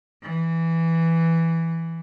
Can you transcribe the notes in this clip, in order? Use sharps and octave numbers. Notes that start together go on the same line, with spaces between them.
E3